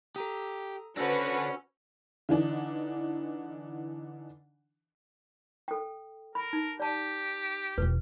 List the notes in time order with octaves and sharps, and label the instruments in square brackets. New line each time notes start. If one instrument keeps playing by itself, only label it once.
[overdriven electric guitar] G4 [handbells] A4 A#5 D#6
[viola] C#4 [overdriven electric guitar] D4 A4 [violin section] F#4 B4 [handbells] C5 E6 A#6
[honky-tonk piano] D3 E3 D4 D#4
[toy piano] A4 G5
[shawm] A#4 [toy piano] B5
[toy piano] D#4
[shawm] G4 [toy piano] D5 A5
[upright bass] E1 F4 [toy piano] B4